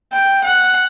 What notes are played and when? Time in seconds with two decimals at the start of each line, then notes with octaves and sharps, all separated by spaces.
0.12 G5
0.44 F#5